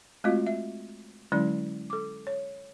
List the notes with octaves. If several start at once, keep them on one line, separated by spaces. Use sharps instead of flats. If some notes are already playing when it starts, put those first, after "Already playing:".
G#3 A3 C4 F4 F#4 D#5
E5
D3 F#3 G#3 C#4 E4 D5
A4 D6
C#5